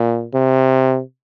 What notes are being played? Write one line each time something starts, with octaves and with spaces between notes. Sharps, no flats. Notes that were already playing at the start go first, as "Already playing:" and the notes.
Already playing: A#2
C3